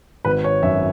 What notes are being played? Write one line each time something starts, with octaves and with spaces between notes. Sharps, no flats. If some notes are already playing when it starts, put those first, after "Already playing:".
G#1 B4
C#5
F#2 E5